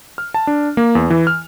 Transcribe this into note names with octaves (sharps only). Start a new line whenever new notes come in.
F6
A5
D4
A#3
E2
E3
F6